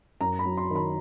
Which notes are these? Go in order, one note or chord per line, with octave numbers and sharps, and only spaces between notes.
F#2 A#5
B5
F#3
C6
D#3
B5